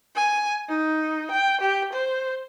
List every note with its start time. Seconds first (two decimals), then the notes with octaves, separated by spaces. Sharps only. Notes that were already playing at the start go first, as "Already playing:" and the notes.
0.15 G#5
0.69 D#4
1.31 G5
1.61 G4
1.93 C5